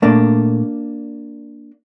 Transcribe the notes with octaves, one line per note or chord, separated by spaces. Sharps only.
A#2 A3 A#3 D4